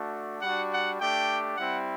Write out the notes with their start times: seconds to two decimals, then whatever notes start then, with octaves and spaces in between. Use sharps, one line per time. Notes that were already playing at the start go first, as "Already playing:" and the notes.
Already playing: A3 D4 F#4
0.41 G3 D4 F#4 F#5
0.71 F#5
0.99 A3 D4 G4 G5
1.57 G3 C4 E4 F#5